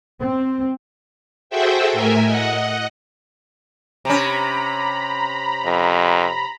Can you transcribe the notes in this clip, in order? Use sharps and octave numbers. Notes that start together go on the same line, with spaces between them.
C4
F#4 G#4 A4 C5 E5 G5
A2 A#4 E5 G#5
D#5 F#5
C3 C#4 A#5 B5
F2